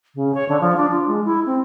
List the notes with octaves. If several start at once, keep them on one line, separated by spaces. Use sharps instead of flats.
C#3
C#5
D3
F3
D4
F4
G#3
E4
C4